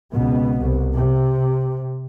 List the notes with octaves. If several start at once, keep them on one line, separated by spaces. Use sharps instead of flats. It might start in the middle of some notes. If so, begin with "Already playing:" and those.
C#2 B2 B3
C2
C3